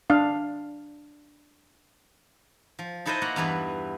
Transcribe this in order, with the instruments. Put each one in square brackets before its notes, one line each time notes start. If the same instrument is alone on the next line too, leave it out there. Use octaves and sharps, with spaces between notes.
[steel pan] D4 F5
[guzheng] F3
D#4 E4 A4 B4 C5 D#5
A#3 F#4 F#5
E2 G2 E3 B4